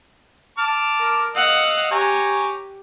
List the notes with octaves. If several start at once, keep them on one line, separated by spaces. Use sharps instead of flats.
A5 D6 F6
A#4
D#5 F5 F#5 E6
G4 C#5 G#5 A#5